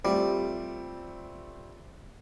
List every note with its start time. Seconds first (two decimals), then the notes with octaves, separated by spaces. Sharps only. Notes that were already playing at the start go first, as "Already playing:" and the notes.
0.04 G3 A3 C4 F4